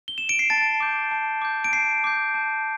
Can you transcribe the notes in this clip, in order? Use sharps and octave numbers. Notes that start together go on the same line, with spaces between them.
G7
E7
D7
C7
A5 A6
D6 G6
A5
D6 G6
D7
A5 C7
D6 G6
A5